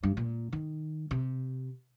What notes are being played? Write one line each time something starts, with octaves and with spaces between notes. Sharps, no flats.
G2
A#2
D#3
C3